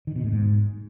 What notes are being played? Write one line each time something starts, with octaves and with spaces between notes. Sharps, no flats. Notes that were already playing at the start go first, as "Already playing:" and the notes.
D#3
B2
A2
G#2